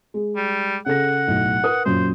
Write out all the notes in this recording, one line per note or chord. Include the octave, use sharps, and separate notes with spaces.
G#3
G3
C#3 A4 F#5 A#6
B1 A2
A#4 B4 D#6
F#2 A#2 C5